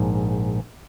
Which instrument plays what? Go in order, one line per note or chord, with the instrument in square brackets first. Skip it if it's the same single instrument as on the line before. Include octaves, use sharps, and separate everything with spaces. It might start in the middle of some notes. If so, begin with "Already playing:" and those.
Already playing: [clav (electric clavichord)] A#1 G#2